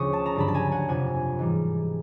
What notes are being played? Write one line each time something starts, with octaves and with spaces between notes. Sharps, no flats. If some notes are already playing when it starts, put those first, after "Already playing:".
Already playing: D2 C#3 F3 C#6 D#6
A5
A#5
G2 D3 F#3 A5 B5
A5
G#5 A#5
F#5 G#5
F2 C3 F3 F#5 G#5
G#2 E3 G3